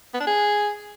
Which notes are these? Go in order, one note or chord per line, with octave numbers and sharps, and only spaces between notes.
B3
D4
G#4